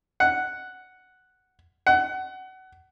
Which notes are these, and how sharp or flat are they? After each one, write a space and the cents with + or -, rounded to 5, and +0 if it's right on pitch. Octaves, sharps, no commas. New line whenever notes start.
F#5 +0
F#5 +25